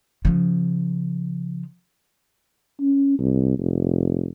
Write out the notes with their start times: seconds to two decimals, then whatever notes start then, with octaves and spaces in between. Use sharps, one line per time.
0.25 C#3 F3
2.80 C#4
3.19 C2
3.58 F1